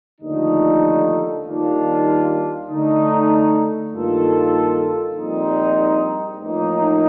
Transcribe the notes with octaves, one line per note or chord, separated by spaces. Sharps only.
D#2 D3 F3 A3 D#4
D#2 D#3 G3 D4 F4
D3 A3 D#4
G2 D#3 A#3 F4 A4
A#1 A#2 G3 C4 D#4
A1 A2 F3 A#3 D#4